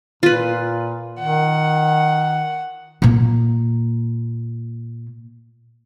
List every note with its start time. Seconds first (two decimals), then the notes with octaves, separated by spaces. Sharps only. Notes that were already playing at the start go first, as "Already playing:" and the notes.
0.23 A#2 F4 B4
1.19 D#3 F#5
3.02 A#2 A#3